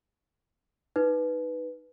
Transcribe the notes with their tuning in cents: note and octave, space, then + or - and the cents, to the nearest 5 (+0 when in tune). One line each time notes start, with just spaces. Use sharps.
D#4 +0 B4 +0